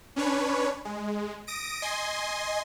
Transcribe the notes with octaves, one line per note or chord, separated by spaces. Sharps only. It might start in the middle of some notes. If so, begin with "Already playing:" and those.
C#4 D4 B4 C#5
G#3
D#6 A#6 D7
D#5 G#5 C6